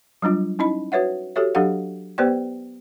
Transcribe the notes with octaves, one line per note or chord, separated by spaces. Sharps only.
F#3 G3 D4 F4
C#4 D#4 E4 D#5 B5
F#4 B4 C#5 E5 F#5
F#4 G4 A4 C#5 E5
F#3 D4 G4 A4 F5 F#5
B3 G4 B4 C5 D5 G5